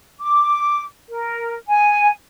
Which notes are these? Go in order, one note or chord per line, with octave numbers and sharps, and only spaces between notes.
D6
A#4
G#5